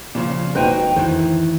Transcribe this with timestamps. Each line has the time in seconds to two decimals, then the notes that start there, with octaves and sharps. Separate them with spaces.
0.15 A#2 C#3 F3
0.55 E1 A#2 D#4 F#4 B4 C5 G5
0.96 F2 A2 D#3 E3 C5